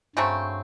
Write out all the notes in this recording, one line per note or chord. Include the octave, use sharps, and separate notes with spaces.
G2 C#3 F#3 A3 C4